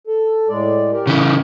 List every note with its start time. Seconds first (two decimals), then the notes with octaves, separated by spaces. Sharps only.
0.07 A4
0.49 A2 G#3 D5
0.92 G4 A#4 D5
1.07 C#3 E3 D#4